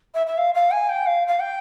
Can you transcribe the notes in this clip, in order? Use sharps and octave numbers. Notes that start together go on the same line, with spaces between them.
E5
E5
F5
F5
G#5
G5
F5
F5
G5